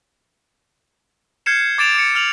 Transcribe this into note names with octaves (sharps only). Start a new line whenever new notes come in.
F6 G6 G#6 C7 C#7 E7
D6 A6 D7 E7 F7
D6 C#7
F6 F7 F#7